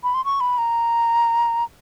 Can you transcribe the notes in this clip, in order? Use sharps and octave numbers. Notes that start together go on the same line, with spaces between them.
B5
C6
C#6
B5
A#5